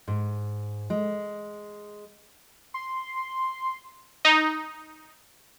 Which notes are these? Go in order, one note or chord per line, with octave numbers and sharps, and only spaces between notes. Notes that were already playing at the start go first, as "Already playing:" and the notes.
G#2
G#3
C6
D#4